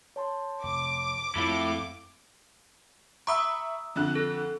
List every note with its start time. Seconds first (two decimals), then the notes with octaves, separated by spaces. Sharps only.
0.16 C#5 A5 C6
0.64 F1 D6
1.36 F2 A3 E4 A4 F5
3.27 E5 A#5 B5 C#6 D#6 E6
3.96 F2 D3 F#6
4.15 A4